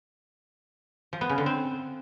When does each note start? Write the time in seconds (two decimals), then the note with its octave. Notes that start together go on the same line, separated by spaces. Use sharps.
1.13 F3
1.21 B3
1.29 C#3
1.38 D3
1.46 C4